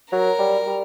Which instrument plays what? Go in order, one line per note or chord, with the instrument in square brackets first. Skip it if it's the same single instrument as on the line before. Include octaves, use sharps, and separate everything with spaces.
[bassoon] F#3 [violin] A#4
[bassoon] G3
G3